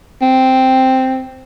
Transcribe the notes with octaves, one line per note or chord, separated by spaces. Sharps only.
C4